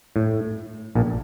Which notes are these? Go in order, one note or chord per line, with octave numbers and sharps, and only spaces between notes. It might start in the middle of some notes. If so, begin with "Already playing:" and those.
A2
A#1 A#2